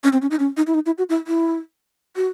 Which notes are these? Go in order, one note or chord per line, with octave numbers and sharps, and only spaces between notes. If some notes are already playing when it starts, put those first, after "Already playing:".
C#4
C4
C#4
D#4
C#4
D#4
E4
D#4
E4
F#4
E4
E4
F#4